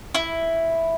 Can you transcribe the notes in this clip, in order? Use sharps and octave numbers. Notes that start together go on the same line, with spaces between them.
E4